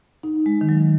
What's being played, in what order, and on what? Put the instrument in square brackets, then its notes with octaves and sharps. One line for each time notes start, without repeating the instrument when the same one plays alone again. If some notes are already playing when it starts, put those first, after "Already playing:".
[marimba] D#4
G#3
D#3
F#3